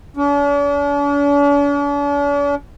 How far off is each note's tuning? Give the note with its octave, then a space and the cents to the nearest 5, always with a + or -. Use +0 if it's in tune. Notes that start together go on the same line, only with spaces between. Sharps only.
D4 -45